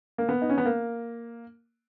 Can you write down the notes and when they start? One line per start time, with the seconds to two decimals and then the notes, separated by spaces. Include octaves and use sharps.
0.18 A#3
0.29 B3
0.42 D#4
0.49 C#4
0.58 B3
0.65 A#3